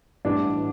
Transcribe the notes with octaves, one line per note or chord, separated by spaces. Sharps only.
A1 A2 E3 G3 D4